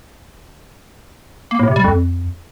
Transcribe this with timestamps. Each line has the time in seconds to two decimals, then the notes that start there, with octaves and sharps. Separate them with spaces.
1.51 A#3
1.59 A2
1.68 C3
1.76 G3
1.84 F2